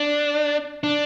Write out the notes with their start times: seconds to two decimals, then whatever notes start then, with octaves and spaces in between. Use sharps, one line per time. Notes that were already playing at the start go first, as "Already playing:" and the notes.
Already playing: D4
0.84 D4